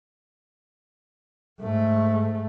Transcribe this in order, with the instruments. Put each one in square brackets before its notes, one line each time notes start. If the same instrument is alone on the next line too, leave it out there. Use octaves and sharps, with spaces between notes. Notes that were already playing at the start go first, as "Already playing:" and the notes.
[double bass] G#2 A3